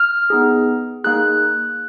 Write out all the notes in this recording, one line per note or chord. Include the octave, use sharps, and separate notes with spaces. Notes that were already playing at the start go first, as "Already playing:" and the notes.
Already playing: F6
B3 D#4 G#4
A#3 D#4 G#4 F#6